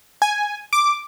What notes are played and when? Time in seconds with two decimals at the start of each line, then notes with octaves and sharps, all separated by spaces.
0.22 G#5
0.73 D6